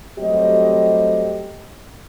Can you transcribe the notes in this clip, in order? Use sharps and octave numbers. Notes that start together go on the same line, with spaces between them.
F#3 G3 A3 C4 G4 D#5